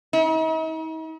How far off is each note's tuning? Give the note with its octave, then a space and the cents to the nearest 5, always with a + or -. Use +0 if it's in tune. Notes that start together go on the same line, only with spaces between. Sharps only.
D#4 +45